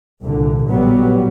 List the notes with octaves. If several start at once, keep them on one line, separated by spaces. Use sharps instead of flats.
C2 A#2 D3
A1 A#2 F#3 G3 B3